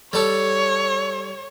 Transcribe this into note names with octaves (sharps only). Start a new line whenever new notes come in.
G3 A4 C#5